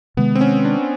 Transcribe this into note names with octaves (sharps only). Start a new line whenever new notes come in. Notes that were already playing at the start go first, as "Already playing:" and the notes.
C3 D#3 G#3 B3
C4
C#4
D4